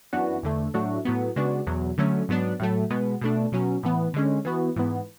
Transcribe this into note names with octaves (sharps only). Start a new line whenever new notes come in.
F#2 E3 B3 D4 F#4
E2 D3 A3
A2 F#3 A3 D4 F#4
A2 F#3 B3
C#3 G#3 B3 D4 F#4
E2 B2 F#3
D3 F#3 A3 C#4
G#2 F#3 B3 D4
A2 F#3 A3
B2 G#3 B3
B2 A3 D4
B2 F#3 C#4
A2 E3 B3
D3 G#3 C#4
E3 B3 F#4
G#2 E3 B3